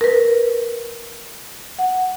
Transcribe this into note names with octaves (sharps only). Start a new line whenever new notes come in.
A#4 B4
F#5